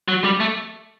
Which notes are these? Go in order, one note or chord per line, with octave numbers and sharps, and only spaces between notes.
F#3
G3
A3